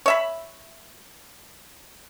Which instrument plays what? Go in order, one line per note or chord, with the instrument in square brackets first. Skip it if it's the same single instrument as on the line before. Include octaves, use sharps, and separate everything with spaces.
[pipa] C#5 E5 B5